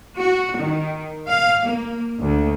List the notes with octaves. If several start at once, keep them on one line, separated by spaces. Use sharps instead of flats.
F#4
D#3
F5
A#3
D2